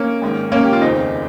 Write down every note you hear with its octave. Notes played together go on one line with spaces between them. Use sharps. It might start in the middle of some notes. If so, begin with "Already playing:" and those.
Already playing: A#3 C#4
G#1 G#2 D#3
A#3 C#4
G4
F4
F1 D#2 C#3 C4 D#4